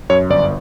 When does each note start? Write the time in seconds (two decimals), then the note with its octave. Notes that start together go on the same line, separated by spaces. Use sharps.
0.10 F#2 C#5
0.30 G1 D5